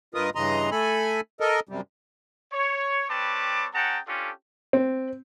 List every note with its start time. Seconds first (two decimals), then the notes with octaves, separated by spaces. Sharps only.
0.14 G2 F4 A#4 B4 D#5 D#6
0.35 G2 C#3 E3 D#5 A#5 C6
0.71 A3 A4 G#5 B5
1.40 A4 A#4 D#5
1.69 F#2 C3 G3
2.53 C#5
3.10 G3 C4 B4 C#5 A5 D6
3.74 C#4 G#4 F#5 G5 A5 A#5
4.07 C#4 D4 F4 G4 A4
4.73 C4